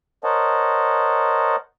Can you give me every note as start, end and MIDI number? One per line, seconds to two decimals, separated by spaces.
0.24 1.56 70
0.24 1.56 72
0.24 1.56 73
0.24 1.56 75
0.24 1.56 78
0.24 1.56 81